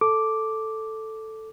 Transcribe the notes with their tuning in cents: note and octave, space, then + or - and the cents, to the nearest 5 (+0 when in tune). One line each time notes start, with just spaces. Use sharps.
A4 +0 D6 +0